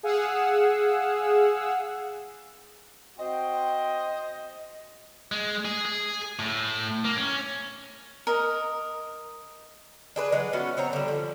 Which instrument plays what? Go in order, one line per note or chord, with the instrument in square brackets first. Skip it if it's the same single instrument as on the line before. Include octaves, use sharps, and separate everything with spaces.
[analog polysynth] G#4 F5 F#5 E6
[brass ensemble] C4 F#4 G5 [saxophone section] C5 D#5
[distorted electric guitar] G#3
G#4
G#4
A2
A#3
C#4
[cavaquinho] A#4 D#5
[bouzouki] D4 G#4 B4
E3 F#3 G#3
A3 B3 C#4 F#4
B3 C4 C#5 A#5
D3 G3
F3